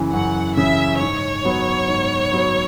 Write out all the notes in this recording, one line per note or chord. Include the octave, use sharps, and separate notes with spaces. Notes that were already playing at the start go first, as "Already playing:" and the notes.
Already playing: F#2 C#3 E3
F#2 F#5
C#3 E3 E5
G#2 C#5
F#3 B3 F#4
G#2
F#3 B3 F#4